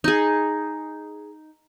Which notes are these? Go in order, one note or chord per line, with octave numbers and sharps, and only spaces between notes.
D#4 G#4